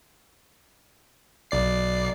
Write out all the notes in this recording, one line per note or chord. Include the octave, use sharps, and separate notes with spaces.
B1 D5 C7